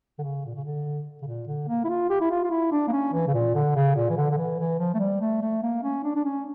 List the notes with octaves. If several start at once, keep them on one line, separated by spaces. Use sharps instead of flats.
D3
C#3
A#2
C#3
D3
C#3
A#2
D3
A#3
E4
F4
G4
E4
F4
F4
E4
D4
A#3
C#4
E3
C#3
A#2
D3
C#3
A#2
E3
D3
D3
E3
E3
F3
A3
G3
A3
A3
A#3
C#4
D4
D4
C#4